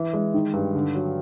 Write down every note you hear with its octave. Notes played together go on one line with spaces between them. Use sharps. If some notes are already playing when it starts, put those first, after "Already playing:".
Already playing: E3
G#3
D#3
G2
D3
F#3